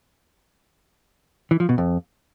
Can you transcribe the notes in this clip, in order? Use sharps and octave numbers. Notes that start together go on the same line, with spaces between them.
E3
F3
B2
F2